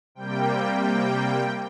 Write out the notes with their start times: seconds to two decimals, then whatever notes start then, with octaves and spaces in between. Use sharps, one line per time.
0.15 C3 G3 A#3 G5
0.77 G5